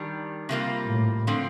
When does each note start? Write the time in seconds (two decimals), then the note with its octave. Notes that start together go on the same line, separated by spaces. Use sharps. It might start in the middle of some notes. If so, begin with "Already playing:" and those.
Already playing: D#3 G3 D4 G4
0.49 C3 G3 A#3 F4
0.88 A2
1.27 D3 F3 C4